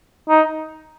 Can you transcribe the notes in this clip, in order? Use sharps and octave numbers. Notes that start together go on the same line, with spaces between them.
D#4